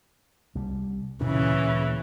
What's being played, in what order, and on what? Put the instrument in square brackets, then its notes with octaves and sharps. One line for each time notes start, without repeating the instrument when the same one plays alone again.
[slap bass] C2 G3
[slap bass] D2 A#2 C#4 [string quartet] C#3 E3